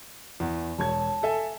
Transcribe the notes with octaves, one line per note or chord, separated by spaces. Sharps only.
E2
E1 C#5 A5 G#6
A4 E5 G#5